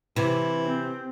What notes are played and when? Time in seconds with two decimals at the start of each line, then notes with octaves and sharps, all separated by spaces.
0.16 C3 E3
0.65 C4